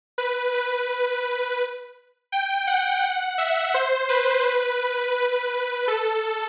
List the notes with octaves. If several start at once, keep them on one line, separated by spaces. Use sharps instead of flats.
B4
B4
G5
F#5
F#5
E5
C5
B4
B4
A4